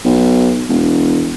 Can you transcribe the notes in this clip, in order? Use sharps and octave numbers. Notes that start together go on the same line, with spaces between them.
B1
E1